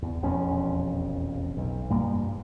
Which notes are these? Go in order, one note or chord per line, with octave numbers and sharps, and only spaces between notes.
E2
E1 A#1 F2 C#4
B1
F1 G2 A#3